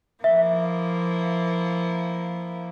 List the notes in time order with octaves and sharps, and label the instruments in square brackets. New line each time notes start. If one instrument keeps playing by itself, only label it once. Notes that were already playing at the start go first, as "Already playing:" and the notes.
[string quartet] F3 A#3 E4 [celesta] E5